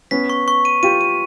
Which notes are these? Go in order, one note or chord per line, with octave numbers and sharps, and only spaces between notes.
B3 C#4 B6
C#6
C#6
D#7
F4 G4 D#7
D#7